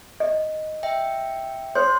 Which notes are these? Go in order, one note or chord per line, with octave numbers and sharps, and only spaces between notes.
D#5
E5 G5
C5 C#5 C6